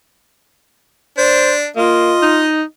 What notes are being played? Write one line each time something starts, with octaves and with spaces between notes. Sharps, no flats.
D4 C5
A#3 F4 D#5
D#4